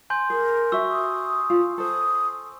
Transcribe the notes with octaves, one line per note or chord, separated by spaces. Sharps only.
G#5 C6 G6
G#4 A#4
F#4 E5 C#6 E6
D#6
F4
A4 C5 D#6